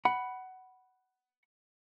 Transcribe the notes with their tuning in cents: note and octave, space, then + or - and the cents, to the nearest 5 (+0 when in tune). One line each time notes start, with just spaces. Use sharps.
F#5 +15 B5 -5